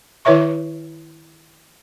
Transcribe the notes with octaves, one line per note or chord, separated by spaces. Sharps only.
D#3 E4 B4 C#5 E5 C#6